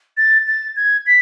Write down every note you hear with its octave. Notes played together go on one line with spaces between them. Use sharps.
A6
A6
G#6
B6